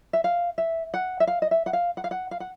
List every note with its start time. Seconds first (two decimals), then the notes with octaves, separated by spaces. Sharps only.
0.13 E5
0.24 F5
0.58 E5
0.94 F#5
1.20 E5
1.27 F5
1.42 D#5
1.51 E5
1.66 F#5
1.73 F5
1.97 F#5
2.04 F5
2.11 F#5
2.31 F5
2.40 F#5